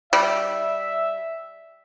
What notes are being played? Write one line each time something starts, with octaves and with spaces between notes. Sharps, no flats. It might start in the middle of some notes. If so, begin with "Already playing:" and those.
G3 E5